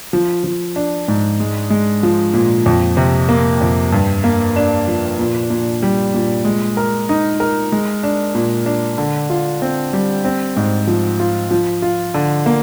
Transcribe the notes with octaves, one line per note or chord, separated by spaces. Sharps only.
F3
F3
D4
G#2
G#3
G#3
F3
A#2
F2
C3
A#3
F2
G2
A#3
D4
F3
A#2
A#2
G3
A#2
G#3
A#4
D#4
A#4
G#3
D4
A#2
D4
D3
F4
C4
G3
C4
G#2
F3
F4
F3
F4
D3
A#3